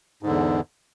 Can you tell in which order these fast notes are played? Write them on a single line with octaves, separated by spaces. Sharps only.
G#2 D3 E2